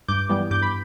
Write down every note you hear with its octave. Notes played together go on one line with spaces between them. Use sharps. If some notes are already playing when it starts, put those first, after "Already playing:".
G2 D6 G6
E3 G3 B3
G2 D6 G6
B5